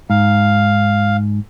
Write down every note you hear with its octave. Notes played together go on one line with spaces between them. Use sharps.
G#2 F5